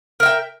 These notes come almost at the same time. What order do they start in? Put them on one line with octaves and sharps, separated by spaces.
A#4 E5 G5